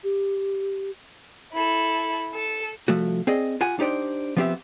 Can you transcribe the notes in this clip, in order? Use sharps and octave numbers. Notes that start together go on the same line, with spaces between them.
G4
E4 A4
A4
C2 F3 A3 F#4
C4 G#4 D5 D#5
F4 G4 F#5 G#5
D4 D#4 G4 C5 D5
F3 B3 C4 E4 G4 E5